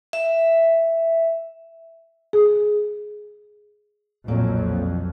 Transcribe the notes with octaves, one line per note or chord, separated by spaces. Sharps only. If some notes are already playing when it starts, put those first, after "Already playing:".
E5
G#4
B1 F2 A#2 F#3